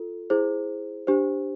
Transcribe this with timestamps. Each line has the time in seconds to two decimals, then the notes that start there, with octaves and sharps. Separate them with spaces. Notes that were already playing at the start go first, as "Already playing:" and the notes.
Already playing: F4 A4
0.30 E4 G#4 C5
1.07 D4 G4 C5